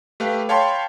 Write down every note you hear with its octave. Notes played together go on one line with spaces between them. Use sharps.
A3 G4 B4 F5
C#5 F5 G5 A5 B5 C6